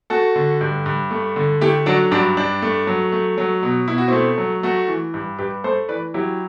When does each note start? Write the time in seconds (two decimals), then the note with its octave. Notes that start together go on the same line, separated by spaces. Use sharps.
0.10 A3 F#4 A4
0.36 D3
0.61 G2
0.86 G2
1.11 A3
1.36 D3
1.61 A3 E4 G4
1.86 F#3 D4 F#4
2.11 G2 D4 F#4
2.37 G2 D4
2.62 A3
2.87 F#3
3.12 A3
3.38 F#3
3.63 B2
3.88 B2 E4
3.98 F#4
4.08 A3 C4 E4
4.38 F#3
4.63 A3 F#4 A4
4.88 E3
5.14 G2
5.39 G2 G4 B4
5.64 A3 A4 C5
5.89 E3 B4 D5
6.14 F#3 E4 G4